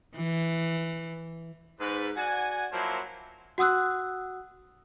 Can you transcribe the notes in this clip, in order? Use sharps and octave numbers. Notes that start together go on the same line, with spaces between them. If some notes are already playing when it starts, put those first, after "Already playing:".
E3
G#2 B4
F#4 D5 F#5 G#5
F3 F#3 A#3 E4 C5
F#4 F#5 D#6 E6 F#6